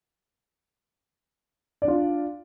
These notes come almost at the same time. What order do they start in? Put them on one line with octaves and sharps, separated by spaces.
D5 D4 F4